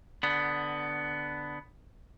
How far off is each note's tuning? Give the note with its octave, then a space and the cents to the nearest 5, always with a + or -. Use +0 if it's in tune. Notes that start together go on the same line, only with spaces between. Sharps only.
D3 +5 B3 +10